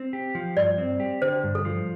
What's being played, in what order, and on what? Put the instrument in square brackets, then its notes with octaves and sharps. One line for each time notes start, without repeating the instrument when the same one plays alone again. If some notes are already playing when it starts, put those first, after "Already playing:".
Already playing: [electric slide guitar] C4
G4
F3
[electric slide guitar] G2 [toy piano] D5
[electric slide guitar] C4
G4
[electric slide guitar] D3 [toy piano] C5
[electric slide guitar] G2
[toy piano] A4
[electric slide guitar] F3